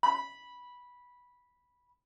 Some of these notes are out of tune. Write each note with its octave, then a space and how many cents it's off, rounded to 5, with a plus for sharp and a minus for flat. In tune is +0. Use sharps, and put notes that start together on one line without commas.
B5 -10